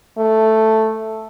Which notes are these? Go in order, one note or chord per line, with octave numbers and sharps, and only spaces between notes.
A3